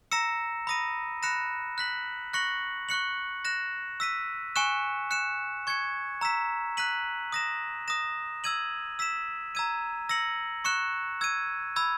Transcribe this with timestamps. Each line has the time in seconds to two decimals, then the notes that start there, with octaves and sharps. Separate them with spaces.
0.12 A#5 E6 A#6 C#7 E7
0.67 B5 D#6 A#6 D#7
1.23 B5 F#6 A#6 C#7 E7
1.78 F#6 B6 F#7
2.33 C#6 F#6 A#6 C#7 F#7
2.89 C#6 F#6 C#7 F#7
3.45 F#6 A#6 E7
4.00 E6 B6 D#7
4.56 G#5 C#6 F#6 C#7 E7
5.11 F#6 C#7 E7
5.67 C#6 G#6 C#7
6.21 A#5 E6 B6 E7
6.77 F#6 B6 D#7 F#7
7.32 D#6 A#6 E7
7.88 D#6 A#6 E7
8.44 E6 G#6 D#7 F#7
8.99 E6 B6 E7
9.55 A#5 E6 G#6 D#7
10.09 E6 A#6 C#7 F#7
10.65 C#6 F#6 C#7 E7
11.21 E6 G#6 D#7
11.76 B5 E6 G#6